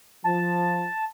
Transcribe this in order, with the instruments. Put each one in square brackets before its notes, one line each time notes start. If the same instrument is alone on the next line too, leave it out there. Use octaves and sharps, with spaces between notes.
[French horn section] F3 [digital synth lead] A5